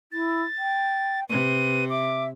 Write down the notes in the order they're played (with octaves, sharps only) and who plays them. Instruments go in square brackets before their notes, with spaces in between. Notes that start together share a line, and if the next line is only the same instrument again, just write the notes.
[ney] E4 [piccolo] A6
[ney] G5
[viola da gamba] C3 [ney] B4 [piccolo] D#7
[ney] E5 [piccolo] D6